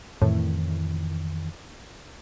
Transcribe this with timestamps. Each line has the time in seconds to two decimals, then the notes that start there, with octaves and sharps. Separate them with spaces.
0.21 F2 A2 D#3 E3